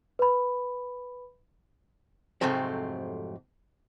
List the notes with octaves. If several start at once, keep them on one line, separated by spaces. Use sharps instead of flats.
B4 B5
F2 G#2 C3 F#3 A3 C4